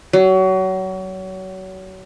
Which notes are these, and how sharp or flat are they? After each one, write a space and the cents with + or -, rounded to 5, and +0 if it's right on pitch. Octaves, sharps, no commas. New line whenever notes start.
F#3 +30